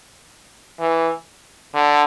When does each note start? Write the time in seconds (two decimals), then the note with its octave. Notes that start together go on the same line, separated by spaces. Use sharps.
0.80 E3
1.75 D3